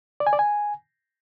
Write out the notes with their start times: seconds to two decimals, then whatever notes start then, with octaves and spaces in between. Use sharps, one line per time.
0.20 D5
0.27 G#5
0.33 D5
0.39 G#5